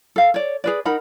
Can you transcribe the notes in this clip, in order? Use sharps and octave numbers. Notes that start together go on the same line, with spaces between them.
A4 F5
C#5 D5
G#4 B4 D5
D#4 A#4 F#5 B5